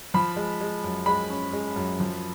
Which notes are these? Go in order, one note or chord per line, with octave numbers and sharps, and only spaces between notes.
F3 B5
G#3
G#3
F#2
G#3 B5
C#4
G#3
F#2
F3